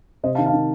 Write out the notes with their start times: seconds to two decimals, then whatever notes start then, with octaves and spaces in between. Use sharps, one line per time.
0.23 C3 C5 D#5
0.35 F5 A5
0.38 D#3
0.46 F5 A5
0.53 D#3